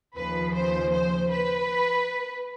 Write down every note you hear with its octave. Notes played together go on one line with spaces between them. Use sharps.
D#2 C#3 F3 B4
C5
C5
B4